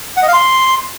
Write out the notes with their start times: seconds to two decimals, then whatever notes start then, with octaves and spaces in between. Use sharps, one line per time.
0.17 F#5
0.22 D#5
0.28 F5
0.33 C6